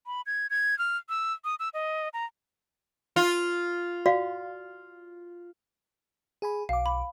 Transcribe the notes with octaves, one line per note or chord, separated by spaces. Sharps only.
B5
G#6
G#6
F6
E6
D#6
E6
D#5
A#5
F4
F#4 D5 F5
G#4 G#5 B5
B1 F5 D6
B5